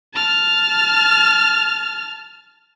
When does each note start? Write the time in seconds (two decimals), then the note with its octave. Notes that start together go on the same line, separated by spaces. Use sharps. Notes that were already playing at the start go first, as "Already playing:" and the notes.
0.14 A5 F6